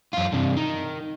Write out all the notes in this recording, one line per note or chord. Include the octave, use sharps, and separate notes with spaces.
F#2 F4
G2 C3
D#3